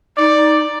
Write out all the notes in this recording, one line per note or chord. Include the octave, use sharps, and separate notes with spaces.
D#4 D5